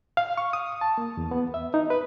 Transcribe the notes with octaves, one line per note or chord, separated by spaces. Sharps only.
F5
C#6
D#6
A5
A#3
E2
B3
E5
D#4
B4